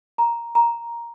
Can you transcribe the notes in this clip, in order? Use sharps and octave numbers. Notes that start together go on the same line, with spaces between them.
A#5
A#5